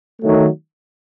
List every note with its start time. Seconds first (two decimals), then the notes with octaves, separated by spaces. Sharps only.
0.21 D#3 F#3 A3